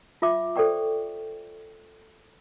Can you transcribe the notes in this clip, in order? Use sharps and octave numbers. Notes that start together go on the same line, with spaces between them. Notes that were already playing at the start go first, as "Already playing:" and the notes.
F4 E5 D6
A4 C5 D5 G5 C#6